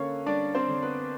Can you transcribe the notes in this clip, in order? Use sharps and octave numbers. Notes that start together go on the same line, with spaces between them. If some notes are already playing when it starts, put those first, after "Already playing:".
Already playing: D3 A#3 C#4 C#5 F5
G3 D4 D5
C4 C5
D3
B3 B4